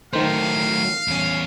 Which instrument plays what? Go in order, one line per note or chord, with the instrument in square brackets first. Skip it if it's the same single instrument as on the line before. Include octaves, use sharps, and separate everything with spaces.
[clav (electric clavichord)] D#3 C5 [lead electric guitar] F#3 A3 [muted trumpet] F5
[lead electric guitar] E2 C#4